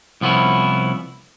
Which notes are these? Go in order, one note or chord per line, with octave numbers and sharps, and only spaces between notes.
C2 F3 B3 C#4 E4